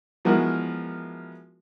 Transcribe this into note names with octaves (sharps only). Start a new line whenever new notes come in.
E3 F3 G#3 B3 F#4 A#4